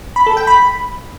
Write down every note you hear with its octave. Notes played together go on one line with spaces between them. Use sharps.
B5
A4
G5
B5